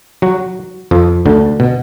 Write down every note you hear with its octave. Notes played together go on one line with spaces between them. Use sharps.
F#3 F#4
F2 F3
D2 D3
B2